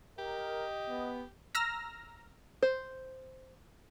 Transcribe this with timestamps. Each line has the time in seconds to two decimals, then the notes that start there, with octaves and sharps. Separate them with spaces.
0.19 G4 A#4 D#5
0.88 B3
1.55 A#5 E6 F6 A#6
2.63 C5